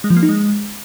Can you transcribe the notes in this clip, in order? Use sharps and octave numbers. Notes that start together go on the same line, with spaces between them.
G#3
F3
A#3
D#4
G#3